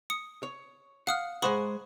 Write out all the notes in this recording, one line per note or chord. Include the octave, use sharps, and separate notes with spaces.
D#6 C#7
C#5
F5 F#5 D#6 F6
G#3 C5 F#5 B5 C#6 D#6